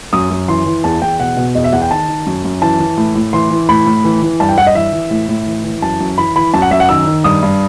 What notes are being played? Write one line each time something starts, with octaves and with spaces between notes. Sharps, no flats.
F#2 D#6
F#2
E3 C6
E3
E2 A5
E2 G5
B2 F#5
B2
E2 D#5
E5
E2 F#5
G5
D#3 A5
D#3
F#2
F#2
E3 A5
E3
A2
A2
E3 C6
E3
A2 B5
A2
E3
E3
G2 A5
G5
G2 F#5
D#5
E3 E5
E3
A2
A2
E3
E3
F#2 A5
F#2
E3 B5
E3 B5
F#2 A5
F#5
F#2 E5
F#5
D#3 E6
D#3
G2 D#6
G2